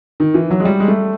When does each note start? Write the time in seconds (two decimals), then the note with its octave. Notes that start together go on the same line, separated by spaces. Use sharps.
0.20 D#3
0.34 E3
0.50 F#3
0.60 G#3
0.65 G3
0.80 G#3
0.88 A3